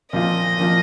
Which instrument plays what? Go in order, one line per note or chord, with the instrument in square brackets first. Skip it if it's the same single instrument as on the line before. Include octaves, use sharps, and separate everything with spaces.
[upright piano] A#2 F3 C4 F4 [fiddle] D#5
[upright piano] A#2 F3 C4 F4